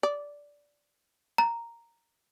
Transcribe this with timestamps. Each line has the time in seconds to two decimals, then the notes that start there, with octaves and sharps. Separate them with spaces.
0.03 D5
1.38 A#5